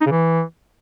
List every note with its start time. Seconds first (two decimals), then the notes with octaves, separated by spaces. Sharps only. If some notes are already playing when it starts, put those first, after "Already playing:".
0.01 D#4
0.06 C#3
0.11 E3